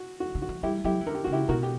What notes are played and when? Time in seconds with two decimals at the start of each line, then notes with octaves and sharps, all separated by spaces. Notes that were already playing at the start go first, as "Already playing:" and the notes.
Already playing: F#4
0.20 F#4
0.35 D3
0.42 F#4
0.49 E3
0.63 G3 E4 G4
0.84 F#3 E4 G4
1.01 E3
1.06 D3 A#4
1.15 G4
1.24 C#3 F#4
1.33 E4 G4
1.48 B2 F#4 A#4
1.63 G4